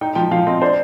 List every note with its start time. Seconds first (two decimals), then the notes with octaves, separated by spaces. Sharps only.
0.01 D#4 G5
0.15 F3 G5
0.31 F3 F5
0.47 C4 D#5
0.61 D4 C5